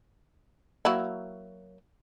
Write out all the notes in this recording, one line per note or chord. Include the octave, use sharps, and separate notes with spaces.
F#3 A#3 E4